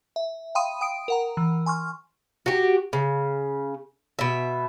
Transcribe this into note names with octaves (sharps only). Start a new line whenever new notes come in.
E5
F5 G5 B5 C6 D#6 D#7
G5 D#6 D7
A#4 F#5 A#5
E3
G#5 C6 C#6 F6
F#4 G4
C#3
B2 E5